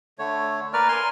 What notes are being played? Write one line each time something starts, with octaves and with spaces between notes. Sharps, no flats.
D3 A3 C#5
A#3 A#4 B4 D5 F6
G#5 C6 F6